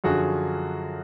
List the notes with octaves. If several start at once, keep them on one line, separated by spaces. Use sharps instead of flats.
F#2 D3 F3 F#4 G#4